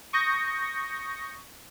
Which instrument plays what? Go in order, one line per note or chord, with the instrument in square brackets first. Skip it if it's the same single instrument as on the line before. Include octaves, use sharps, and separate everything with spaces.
[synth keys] C#6 D#6 G6 A#6 C#7